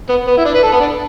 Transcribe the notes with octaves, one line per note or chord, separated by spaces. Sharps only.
B3
B3
E4
D4
B4
A4
B3
D4